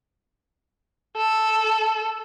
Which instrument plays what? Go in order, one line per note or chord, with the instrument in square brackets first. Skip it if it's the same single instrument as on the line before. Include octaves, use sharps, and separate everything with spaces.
[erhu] A4